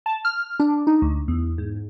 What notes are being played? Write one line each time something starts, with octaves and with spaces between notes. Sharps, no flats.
A5
F6
D4
D#4
D2
E2
G#2